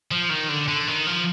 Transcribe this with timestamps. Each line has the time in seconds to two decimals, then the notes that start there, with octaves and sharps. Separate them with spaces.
0.11 F3
0.30 D#3
0.49 D3
0.68 D3
0.87 D#3
1.07 F3